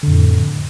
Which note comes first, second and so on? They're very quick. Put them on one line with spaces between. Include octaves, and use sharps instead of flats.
D3 F2 A2